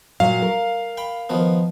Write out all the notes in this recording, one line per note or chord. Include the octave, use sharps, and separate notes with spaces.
A#2 F#3 F5
A#4
G5 B5
D#3 F3 B3